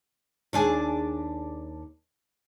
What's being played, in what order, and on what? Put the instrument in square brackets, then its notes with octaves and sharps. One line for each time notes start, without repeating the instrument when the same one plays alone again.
[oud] D#2 D4 G#4